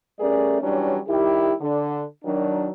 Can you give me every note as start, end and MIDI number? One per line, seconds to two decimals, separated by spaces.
0.20 0.60 55
0.20 0.60 57
0.20 0.60 61
0.20 0.60 68
0.20 0.60 70
0.20 0.60 74
0.62 0.98 52
0.62 0.98 54
0.62 0.98 55
0.62 0.98 61
0.62 0.98 62
1.08 1.53 51
1.08 1.53 55
1.08 1.53 64
1.08 1.53 67
1.61 2.03 50
2.24 2.69 51
2.24 2.69 54
2.24 2.69 62